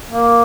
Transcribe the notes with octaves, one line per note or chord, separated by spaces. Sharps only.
A#3